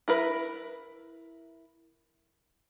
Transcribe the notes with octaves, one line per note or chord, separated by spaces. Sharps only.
E4 A#4 B4